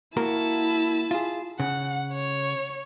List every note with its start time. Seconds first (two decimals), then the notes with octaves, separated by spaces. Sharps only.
0.17 A#3 E4 F#4 A#4 A5
1.11 F4 G#4
1.60 C#3 F#5
2.13 C#5